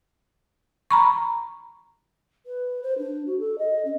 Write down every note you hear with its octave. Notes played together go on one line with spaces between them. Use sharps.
A#5 B5 C#6
B4
C5
D4
F#4
A4
D#5
C#4